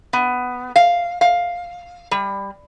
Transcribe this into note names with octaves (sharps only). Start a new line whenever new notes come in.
B3
F5
F5
G3